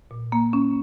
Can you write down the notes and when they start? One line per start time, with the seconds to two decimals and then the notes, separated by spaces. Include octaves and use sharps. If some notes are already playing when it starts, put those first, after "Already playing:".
0.11 A#2
0.32 A#3
0.53 C#4